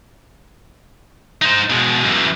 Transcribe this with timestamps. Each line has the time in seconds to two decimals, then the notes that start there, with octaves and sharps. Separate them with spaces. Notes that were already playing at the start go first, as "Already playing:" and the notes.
1.42 D#4 C5
1.70 B2 G#3
2.04 F#2 E3